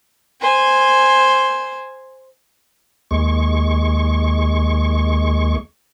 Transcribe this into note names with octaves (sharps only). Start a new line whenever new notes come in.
C5 G#5
D#2 G#3 C#6